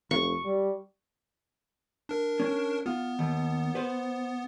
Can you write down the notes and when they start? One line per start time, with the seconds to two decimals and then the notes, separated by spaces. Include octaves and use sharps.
0.11 F1 C#6
0.45 G3
2.09 D4 A#4
2.40 C#4
2.86 B3 F4
3.19 D#2
3.75 B4 C5